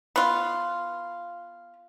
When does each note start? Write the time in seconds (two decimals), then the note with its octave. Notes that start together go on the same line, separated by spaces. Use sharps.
0.16 B3 F4